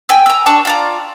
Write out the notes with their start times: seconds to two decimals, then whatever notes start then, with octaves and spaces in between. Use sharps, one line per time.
0.09 G5 G#5 E6
0.26 A#5 E6
0.46 D4 A5 C#6 D6
0.65 F4 D5 A#5